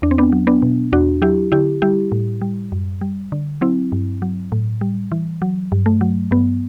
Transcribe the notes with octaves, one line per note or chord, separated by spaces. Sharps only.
E2 D4
C4
B3 D4
F#3
B3 D4
B2
E2 D4 F#4
F#3 E4 G4
D3 E4 G4
G3 E4 G4
A2
G3
F#2
G3
D3
F#3 C4 E4
G2
F#3
A2
G3
E3
F#3
G2
A3
F#3
G2 B3